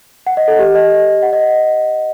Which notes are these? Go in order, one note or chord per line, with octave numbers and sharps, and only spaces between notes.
F#5
D#5
A4
G4
D#5
F#5
D#5